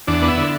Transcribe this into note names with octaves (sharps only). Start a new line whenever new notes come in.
E2 D4
B3
E4
D3